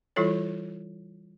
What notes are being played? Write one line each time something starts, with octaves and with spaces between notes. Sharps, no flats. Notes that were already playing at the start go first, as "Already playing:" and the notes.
E3 G3 E4 F4 A4 C#5